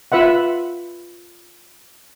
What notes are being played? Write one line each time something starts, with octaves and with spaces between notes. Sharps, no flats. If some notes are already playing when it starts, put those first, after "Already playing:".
F4 B4 E5 F#5